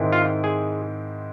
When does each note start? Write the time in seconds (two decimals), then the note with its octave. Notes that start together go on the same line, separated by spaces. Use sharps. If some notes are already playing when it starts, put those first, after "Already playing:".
Already playing: G#2 D#3 G#3 C4 E4
0.12 F4
0.44 G#4